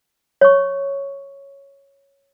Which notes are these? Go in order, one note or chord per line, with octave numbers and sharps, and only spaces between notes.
C#5 C#6